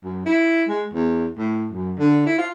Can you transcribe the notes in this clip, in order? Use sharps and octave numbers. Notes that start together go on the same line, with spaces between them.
F#2
E4
G#3
E2
A2
F#2
D3
E4
F4